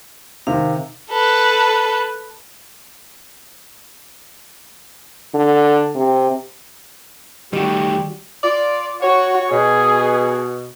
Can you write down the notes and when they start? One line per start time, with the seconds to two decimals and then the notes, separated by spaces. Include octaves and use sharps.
0.47 C3 D#3 F5
1.10 A4 B4
5.34 D3
5.95 C3
7.53 D#3 G3 A3 F#4 G4
8.43 F4 D5
9.02 F#4 C#5
9.51 B2 G#4